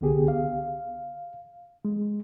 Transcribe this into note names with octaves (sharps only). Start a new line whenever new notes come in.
C2 D3 B3 G4 G#4
F5
G#3